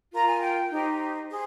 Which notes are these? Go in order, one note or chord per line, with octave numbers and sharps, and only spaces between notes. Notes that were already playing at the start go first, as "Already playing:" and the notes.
F4 A#4 A#5
G#5
G5
D#4 G4 C5
G#4 C5